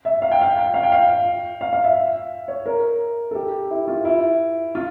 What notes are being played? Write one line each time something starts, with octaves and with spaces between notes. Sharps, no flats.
E5
F5
G5
F5
G5
F5
G5
F5
F5
F5
E5
C#5
A#4
A4
G4
E4
F4
E4
F4